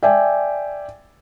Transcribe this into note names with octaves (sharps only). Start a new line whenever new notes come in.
D5 E5 G5 G#5